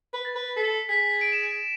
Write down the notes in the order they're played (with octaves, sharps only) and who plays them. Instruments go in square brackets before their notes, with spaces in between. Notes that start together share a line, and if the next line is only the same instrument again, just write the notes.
[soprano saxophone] B4
[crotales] A6
[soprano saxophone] B4
[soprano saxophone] A4 [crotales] B6
[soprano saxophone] G#4 [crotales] B6
[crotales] D7
E7
D7